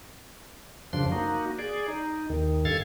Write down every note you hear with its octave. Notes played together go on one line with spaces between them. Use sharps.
F#2 C#3 F3 D4 C6
A#3 D#4 F#4
G#4 D5
D#4
D#2 D#3
G2 A4 F5 G#6 A6